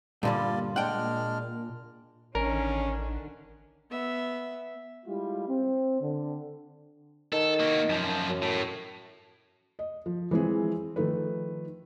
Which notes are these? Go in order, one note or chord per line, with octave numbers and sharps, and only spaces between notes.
G2 A#2 D3 G3 F4 D5
G#3 D4 F#5 G5 F6
A1 D3 D#3 C#4 D4 A#4
B3 E5
G3 G#3 E4 F4 G4
C4
D3
D#3 A4
A#3 F#4
F#2 F3
F#2
A2
D#5
F3
E3 F3 G#3 C4 E4 G#4
D#3 F3 A3 B4